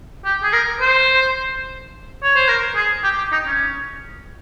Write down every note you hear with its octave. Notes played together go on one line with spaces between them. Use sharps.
G4
G#4
A#4
C5
C#5
C5
A#4
G#4
G4
G4
D#4
C#4